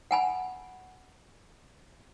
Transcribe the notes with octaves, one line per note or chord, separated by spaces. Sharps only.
F#5 G#5 B5